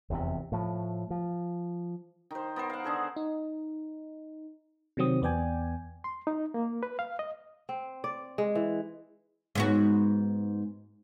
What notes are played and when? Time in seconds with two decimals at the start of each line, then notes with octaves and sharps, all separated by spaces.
0.10 F1 E2 G2 C3
0.52 A2 F3
1.10 F3
2.31 D#3 C5
2.56 B3 A#4 C5
2.70 F5 F#5
2.84 D3 G#4 A4
3.16 D#4
4.97 C3 D#3 F#3 C4 D#6
5.22 E2 B3 D5 G5 G#5
6.04 C6
6.27 D#4
6.54 A#3
6.83 B4
6.99 F5
7.19 D#5
7.69 C4
8.04 D5
8.38 G#3
8.55 E3
9.55 G#2 B3 F#4